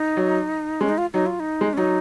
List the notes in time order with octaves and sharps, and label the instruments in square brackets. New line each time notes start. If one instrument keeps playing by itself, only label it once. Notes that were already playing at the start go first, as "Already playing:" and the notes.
Already playing: [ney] D#4
[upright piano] F#3
[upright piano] G#3 [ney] C#4
[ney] D#4
F4
[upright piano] F#3 [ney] D#4
[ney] F4
D#4
[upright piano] G#3
[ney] C#4
[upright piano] F#3 [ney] D#4